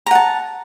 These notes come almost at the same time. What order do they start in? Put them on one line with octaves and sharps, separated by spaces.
A#5 F#5 A5